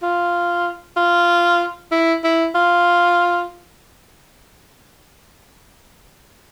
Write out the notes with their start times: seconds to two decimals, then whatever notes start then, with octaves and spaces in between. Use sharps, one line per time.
0.03 F4
0.97 F4
1.92 E4
2.24 E4
2.55 F4